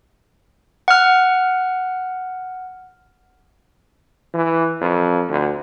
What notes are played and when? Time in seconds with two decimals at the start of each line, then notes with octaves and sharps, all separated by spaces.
0.88 F#5 F6
4.34 E3
4.81 F2
5.29 D2